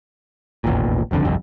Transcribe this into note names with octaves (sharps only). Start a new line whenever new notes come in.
E1 A1 D#2 A#2
F#1 C2 F2 D3
G1 C2 F2